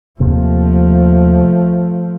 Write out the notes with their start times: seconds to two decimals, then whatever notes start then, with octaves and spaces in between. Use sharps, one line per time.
0.20 D#2 C3 F3 A3 A#3